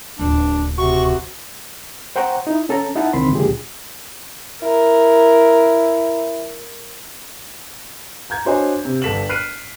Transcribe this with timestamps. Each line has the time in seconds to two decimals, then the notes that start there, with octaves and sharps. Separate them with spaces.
0.19 D1 C#2 D4
0.78 C3 F#4 C#6
2.16 C5 F#5 G5 A#5 C#6
2.47 D#4 E4
2.69 C#4 A4 A5 A#5
2.96 D#4 E4 F#5 A5
3.13 C2 D3 D#3 C4 B5 C6
3.32 C#2 A#2 D3 F3 G4 G#4
4.62 E4 A#4
8.30 A#5 G6 G#6
8.45 D4 F#4 C5 C#5 D#5 G#5
8.85 C3
9.02 G1 A4 B6 E7 F#7
9.29 F6 F#6 B6 C7 D7 D#7